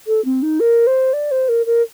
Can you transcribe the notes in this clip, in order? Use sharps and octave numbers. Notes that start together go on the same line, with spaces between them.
A4
C4
D#4
A#4
C5
D5
C5
A#4
A#4